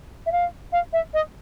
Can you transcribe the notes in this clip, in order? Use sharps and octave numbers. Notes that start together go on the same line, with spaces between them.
E5
F5
F5
E5
D#5